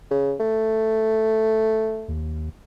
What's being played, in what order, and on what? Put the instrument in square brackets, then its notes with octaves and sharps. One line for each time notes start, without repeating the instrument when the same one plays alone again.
[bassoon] C#3
A3
[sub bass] D#2